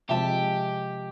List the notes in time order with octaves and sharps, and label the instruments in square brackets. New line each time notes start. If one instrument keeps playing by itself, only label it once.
[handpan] C3 F3 G#3 [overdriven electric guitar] G4 [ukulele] E5 A5